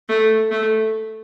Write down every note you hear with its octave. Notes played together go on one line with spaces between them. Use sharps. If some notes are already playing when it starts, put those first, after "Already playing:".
A3
A3